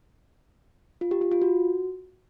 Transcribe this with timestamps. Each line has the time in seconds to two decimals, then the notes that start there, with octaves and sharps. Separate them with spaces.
1.01 F4
1.11 G4
1.21 F4
1.32 F4
1.42 F#4